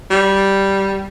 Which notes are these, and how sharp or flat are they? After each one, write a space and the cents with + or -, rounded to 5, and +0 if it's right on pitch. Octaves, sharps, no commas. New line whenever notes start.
G3 -5